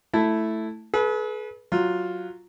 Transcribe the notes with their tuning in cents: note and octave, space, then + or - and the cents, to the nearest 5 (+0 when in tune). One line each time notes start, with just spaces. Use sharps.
A3 +0 E4 +0 A5 +0
G#4 +45 B4 -20
F#3 +0 F4 +5